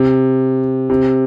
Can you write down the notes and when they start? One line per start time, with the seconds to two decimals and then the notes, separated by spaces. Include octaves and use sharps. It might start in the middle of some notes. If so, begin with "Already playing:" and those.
Already playing: C3
0.89 C3